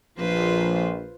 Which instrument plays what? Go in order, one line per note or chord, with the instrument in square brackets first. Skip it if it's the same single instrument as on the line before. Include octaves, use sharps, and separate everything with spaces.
[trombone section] A#1 [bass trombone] F3 [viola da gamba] F4 B4 C5